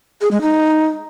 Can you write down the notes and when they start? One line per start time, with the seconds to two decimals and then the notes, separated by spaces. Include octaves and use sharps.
0.21 G#4
0.31 G#3
0.41 D#4